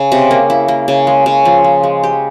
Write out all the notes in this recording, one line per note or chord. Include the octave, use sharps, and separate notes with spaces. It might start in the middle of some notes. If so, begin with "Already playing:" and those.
Already playing: C#3
C3
A#3
E4
A#3
C#3
G#3
C#3
F3
F3
G#3
G4